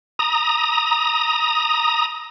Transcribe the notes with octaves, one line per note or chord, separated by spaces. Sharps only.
A#5 D#6